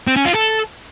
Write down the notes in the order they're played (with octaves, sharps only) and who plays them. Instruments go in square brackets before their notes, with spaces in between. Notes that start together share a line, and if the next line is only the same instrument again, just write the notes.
[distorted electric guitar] C4
C#4
F4
A4